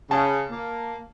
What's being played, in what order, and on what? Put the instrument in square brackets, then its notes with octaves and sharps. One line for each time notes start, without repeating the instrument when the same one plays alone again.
[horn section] C#3 [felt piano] A5
[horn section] A#3